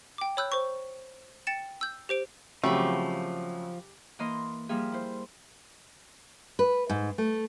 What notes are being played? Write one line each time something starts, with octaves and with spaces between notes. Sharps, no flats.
G5 D6
C#5 B5 E6 F#6 G6
C5 C#6
G5 A6 C#7 E7
E6 G6
G4 C5 D7
C#3 F3 F#3 A3 C4 G4 B5
E3 A#3 D#5 C6
F3 G3 A#3 F4 G#4 E5
E4 C5
B4
G#2
A3